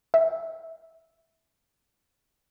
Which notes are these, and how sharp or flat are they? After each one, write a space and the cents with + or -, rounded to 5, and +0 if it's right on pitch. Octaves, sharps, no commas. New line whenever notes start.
E5 -10